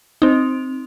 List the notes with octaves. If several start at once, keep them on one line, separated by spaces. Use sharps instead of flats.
C4 D#4